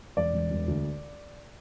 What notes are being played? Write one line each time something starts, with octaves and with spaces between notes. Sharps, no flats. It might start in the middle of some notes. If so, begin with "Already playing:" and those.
E1 D5
E1
E1
D2